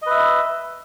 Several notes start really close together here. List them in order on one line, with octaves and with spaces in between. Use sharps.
D#5 B4 E5